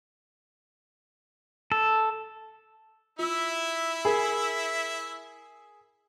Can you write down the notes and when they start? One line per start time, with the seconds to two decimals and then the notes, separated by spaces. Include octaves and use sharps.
1.72 A4
3.19 E4 F4 E5 E6
4.05 G#4 A#4 B5